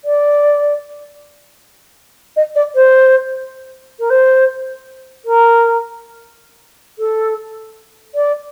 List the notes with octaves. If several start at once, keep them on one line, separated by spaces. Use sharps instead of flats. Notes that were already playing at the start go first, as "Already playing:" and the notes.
D5
D#5
D5
C5
A#4
C5
A#4
A4
D5